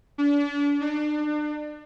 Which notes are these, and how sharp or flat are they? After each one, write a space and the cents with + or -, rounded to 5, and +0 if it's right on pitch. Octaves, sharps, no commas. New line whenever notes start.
D4 -35
D4 +35